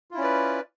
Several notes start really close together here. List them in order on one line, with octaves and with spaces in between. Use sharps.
F4 E4 C#4 D5 B4